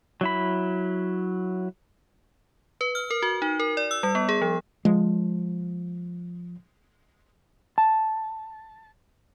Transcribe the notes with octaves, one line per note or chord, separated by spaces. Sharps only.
F#3 E4 B5
B4
F6
A#4
F#4
D#4
A#4
D5
E6
G3
B3
G#4
F3
F3 G#3
A5